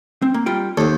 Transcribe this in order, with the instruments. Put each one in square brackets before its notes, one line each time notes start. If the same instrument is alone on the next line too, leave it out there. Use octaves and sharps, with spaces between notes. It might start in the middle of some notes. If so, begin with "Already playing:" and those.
[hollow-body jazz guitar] C4
A#3
G3 F4 G5
[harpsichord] D#2 [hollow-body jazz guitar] A4 C5